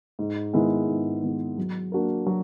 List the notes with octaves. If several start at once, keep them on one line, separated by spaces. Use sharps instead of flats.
G#2
D#3 G#3 B3 E4
G#2
D#3 G#3 B3 E4
F#3
A#3 D4 F#4 A#4
F#3